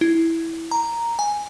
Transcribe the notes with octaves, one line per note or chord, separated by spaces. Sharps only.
E4
A#5
G#5